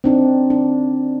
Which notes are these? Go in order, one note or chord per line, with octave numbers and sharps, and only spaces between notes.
C4 D4 D#4
D4